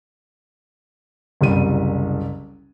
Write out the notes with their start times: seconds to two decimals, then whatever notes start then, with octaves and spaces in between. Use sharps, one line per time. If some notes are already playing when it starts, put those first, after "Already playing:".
1.41 F#1 C2 G3 D#7